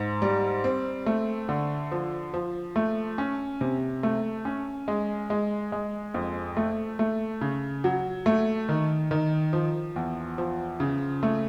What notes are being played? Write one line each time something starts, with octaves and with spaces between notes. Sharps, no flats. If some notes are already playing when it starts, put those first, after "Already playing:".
Already playing: G#2
G3
C4
A3
D3
F3
F3
A3
C#4
C3
A3
C#4
G#3
G#3
G#3
F2
A3
A3
C#3
F#3
A3
D#3
D#3
F3
E2
F3
C#3
A3